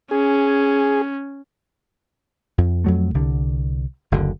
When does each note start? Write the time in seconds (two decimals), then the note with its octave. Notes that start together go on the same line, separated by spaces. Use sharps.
0.11 C#4 G#4
2.58 F2
2.84 F2 F#3 A3
3.14 C2 D3
4.12 F#1 D2 D3